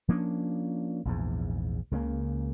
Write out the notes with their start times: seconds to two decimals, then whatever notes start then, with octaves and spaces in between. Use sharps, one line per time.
0.08 F3 A#3 C#4 D4
1.05 A#1 E2 G#2
1.91 C#2 C#3 G#3 A#3